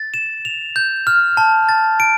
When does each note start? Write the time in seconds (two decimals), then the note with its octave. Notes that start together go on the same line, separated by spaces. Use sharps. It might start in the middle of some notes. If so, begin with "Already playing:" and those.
Already playing: A6
0.14 E7
0.45 F7
0.76 G6
1.07 F6
1.37 A5
1.69 A6
2.00 D7